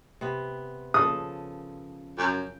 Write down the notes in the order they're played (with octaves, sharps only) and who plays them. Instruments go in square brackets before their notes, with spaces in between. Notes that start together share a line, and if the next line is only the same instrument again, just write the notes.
[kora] C3 B3
[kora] C#3 F3 A4 [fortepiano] D#6
[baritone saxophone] F#2 [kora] G5